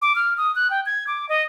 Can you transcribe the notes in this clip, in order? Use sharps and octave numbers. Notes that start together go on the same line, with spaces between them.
D6
F6
D#6
F#6
G5
G#6
D6
D#5